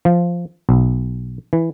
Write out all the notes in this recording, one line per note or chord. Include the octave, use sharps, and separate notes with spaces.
F3
B1
E3